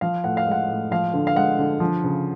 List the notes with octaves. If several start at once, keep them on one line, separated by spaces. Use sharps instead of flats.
F3 F5
A2 F#5
F5
G#3 F#5
A2
F3 F5
D3
F5
G#3 F#5
D3
F3
C#3